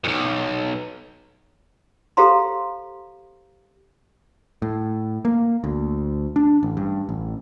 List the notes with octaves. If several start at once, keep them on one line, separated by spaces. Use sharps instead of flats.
B1 F2
G4 A4 C5 F5 A#5 C6
A2
A#3
D2
D4
A1
G2
A1